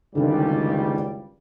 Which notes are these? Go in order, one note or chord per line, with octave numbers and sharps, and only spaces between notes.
F#1 C#2 D3 D#3 G3 C#4